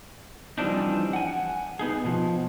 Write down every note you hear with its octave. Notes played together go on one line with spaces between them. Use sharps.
E3 F3 G3 C4 D4 D#4
F#5 G#5
B3 D#4 G#4
B2 F3